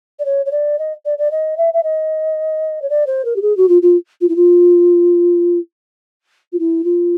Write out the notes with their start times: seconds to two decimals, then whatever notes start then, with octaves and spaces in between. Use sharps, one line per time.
0.19 D5
0.25 C#5
0.46 C#5
0.51 D5
0.79 D#5
1.05 D5
1.18 D5
1.31 D#5
1.57 E5
1.74 E5
1.83 D#5
2.82 C#5
2.90 D5
3.07 C5
3.25 A#4
3.36 G4
3.42 G#4
3.57 F#4
3.69 F4
3.82 F4
4.21 F4
4.29 E4
4.36 F4
6.52 F4
6.59 E4
6.84 F4